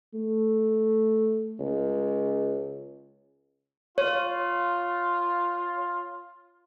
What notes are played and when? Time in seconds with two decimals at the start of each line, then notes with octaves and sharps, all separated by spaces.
0.14 A3
1.59 C#2
3.98 F4 C#5